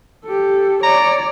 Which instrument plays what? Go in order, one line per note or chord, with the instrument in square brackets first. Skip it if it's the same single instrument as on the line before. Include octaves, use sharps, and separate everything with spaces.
[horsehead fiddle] G4 A4
[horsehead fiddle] C#5 D5 [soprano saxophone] A#5